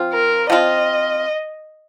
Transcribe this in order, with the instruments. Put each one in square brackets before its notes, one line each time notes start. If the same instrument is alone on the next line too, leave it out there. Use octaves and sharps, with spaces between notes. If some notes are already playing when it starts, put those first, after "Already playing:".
Already playing: [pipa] F3 C4 F4
[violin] A#4
[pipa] F3 C4 F4 [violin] D#5